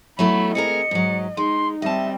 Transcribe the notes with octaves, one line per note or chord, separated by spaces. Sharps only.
F#3 A3 B3 E4 B5
C4 G#4 A#4 D#5 C#7
G#2 F#3
G#3 D#4 C6
G3 C4 D#5 E5 A5